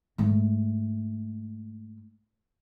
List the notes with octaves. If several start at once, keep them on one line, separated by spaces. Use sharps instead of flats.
G#2 A3